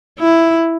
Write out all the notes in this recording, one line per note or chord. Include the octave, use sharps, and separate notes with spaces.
E4